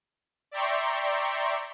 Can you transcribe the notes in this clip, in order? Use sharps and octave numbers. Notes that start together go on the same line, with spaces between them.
D5 E5 G5 A#5 C6 C#6